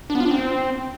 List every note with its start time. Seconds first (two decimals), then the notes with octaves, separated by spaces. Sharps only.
0.10 D4
0.15 B3
0.20 F4
0.25 D4
0.31 C4